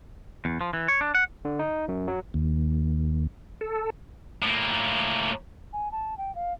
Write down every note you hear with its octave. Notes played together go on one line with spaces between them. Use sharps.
E2
F3
E3
C#5
D4
F#5
D3
D#4
F#2
F#3
D#2
A4
A2 A#3
G#5
A5
G5
F5